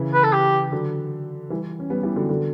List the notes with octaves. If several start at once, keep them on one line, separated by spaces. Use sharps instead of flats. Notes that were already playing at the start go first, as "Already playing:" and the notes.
Already playing: C#3 E3
B4
A4
G4
D3 F#3
E3 G3
C#4
G3 B3
E3 G3
D3 F#3
D3 F#3